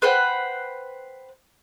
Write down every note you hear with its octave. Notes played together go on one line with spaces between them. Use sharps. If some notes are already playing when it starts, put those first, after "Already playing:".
B4 C5 F#5 G5